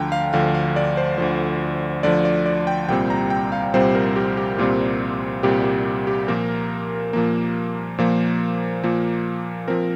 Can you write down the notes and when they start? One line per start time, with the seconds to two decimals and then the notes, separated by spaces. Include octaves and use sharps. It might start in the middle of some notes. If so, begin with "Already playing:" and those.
Already playing: D2 D3 F3 G5 A#5
0.12 F5
0.33 D2 D3 F3 F5
0.54 F5
0.76 D5
0.97 C5
1.18 D2 D3 F3 C5
2.03 D2 D3 F3 D5
2.25 D5
2.46 D5
2.67 G5
2.89 C2 A#2 G3 C4 G5
3.10 A#5
3.30 G5
3.52 F5
3.74 C2 A#2 G3 C4 C5
3.95 A#4
4.16 G4
4.37 G4
4.58 C2 A#2 G3 C4 F4
5.43 C2 A#2 G3 C4 G4
5.64 G4
6.07 G4
6.28 A#2 F3 A#3 A#4
7.13 A#2 F3 A#3
7.98 A#2 F3 A#3 C5
8.84 A#2 F3 A#3
9.68 F3 C4 A#4